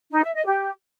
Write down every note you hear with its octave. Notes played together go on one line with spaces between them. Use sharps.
D#4
E5
D#5
G4